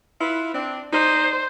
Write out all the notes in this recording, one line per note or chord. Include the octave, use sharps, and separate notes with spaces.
E4 F4 B4
C4 D4
D#4 C5 D5